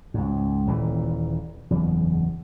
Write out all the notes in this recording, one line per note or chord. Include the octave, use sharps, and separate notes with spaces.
C#2 G#2
D#1 A#2 E3
F#1 E2